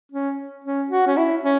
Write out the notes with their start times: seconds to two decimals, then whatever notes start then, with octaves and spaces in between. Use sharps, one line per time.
0.12 C#4
0.64 C#4
0.90 F#4
1.07 C#4
1.17 E4
1.43 C#4